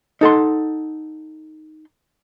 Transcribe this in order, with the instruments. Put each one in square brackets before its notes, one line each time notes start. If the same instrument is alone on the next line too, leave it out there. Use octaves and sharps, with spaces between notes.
[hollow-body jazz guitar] D#4 A4 F#5 C6